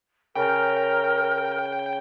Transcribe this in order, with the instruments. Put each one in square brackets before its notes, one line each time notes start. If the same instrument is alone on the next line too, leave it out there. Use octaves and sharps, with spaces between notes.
[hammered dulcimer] C#3 [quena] A#4 [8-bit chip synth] G5